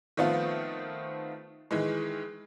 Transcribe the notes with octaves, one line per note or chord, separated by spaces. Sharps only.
D#3 F3 A3 B3 C4 F4
D#3 E3 G#3